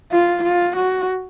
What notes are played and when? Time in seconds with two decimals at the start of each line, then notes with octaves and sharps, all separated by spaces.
0.12 F4
0.43 F4
0.76 F#4